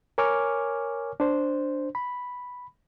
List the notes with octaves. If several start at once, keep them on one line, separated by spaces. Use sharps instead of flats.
A#4 C#5 G#5 C#6 D6 F6
D4 C5
B5